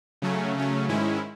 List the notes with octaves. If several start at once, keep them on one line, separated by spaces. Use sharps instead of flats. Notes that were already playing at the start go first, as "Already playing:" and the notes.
C#3 F#3 A3 C#4
C#3 F#3 A3 C#4
G#2 D#3 G#3 C#4 E4